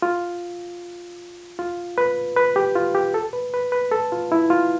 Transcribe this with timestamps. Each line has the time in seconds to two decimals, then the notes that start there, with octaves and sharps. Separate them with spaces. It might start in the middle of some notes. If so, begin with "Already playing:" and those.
0.02 F4
1.59 F4
1.98 B4
2.37 B4
2.56 G4
2.75 F4
2.95 G4
3.14 A4
3.33 B4
3.54 B4
3.72 B4
3.92 A4
4.12 F4
4.32 E4
4.50 F4